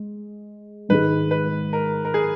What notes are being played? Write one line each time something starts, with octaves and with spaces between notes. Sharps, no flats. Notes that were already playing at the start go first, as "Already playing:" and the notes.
Already playing: G#3
G#2 D#3 G#3 B4
B4
A#4
A#4
G#4